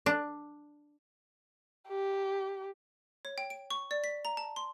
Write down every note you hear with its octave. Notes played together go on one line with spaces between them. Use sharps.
D4
G4
C#5
G5
D7
C#6
D5
B6
A#5
A5
C6